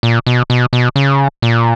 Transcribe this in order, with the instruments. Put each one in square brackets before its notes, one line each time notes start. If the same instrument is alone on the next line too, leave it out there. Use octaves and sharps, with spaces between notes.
[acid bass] A#2
B2
B2
B2
C#3
A#2